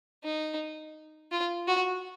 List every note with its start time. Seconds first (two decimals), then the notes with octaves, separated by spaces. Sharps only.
0.24 D#4
1.31 F4
1.67 F#4